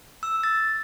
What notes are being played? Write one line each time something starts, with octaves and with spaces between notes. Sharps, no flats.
E6
A6